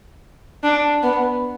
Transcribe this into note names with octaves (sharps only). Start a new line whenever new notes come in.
D4
B3